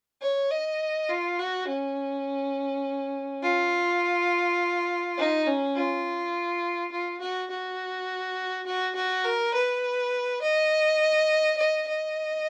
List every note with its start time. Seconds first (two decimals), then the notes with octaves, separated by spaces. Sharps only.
0.21 C#5
0.51 D#5
1.09 F4
1.39 F#4
1.67 C#4
3.43 F4
5.17 D#4
5.47 C#4
5.75 F4
6.92 F4
7.21 F#4
7.50 F#4
8.66 F#4
8.96 F#4
9.24 A#4
9.54 B4
10.42 D#5
11.57 D#5
11.87 D#5